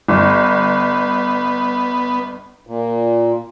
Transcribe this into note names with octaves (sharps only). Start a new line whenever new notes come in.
G1 B3
A#2